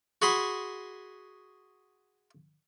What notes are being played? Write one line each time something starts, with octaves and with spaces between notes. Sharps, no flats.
F#4 G#4 B5 C6